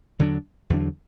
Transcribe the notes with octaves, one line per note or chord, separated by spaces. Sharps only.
E2 D3 F#3 D4
E2 D3 F#3 D4